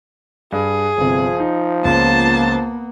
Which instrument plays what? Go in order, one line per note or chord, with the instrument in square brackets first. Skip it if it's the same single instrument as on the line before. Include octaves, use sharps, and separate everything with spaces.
[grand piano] G2 [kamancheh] G#4
[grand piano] G1 C3 [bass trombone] F3
[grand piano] D#4
[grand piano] C#2 C#3 [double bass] A#3 B3 [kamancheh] C5 A5